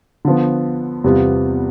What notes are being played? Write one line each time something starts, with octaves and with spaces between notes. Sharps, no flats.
D3 F3 B3
E2 C3 G3 B3 F4